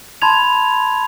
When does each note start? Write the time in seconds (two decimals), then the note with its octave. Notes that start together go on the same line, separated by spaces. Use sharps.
0.22 A5 B5 C6 G#6 F7